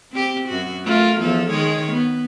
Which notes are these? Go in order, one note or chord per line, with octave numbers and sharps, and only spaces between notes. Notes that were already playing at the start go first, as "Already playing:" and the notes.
C4 G4
F#2 F#4
A3 F4 A#4
E2 F3 A4
D#3 G#3 C#5
B3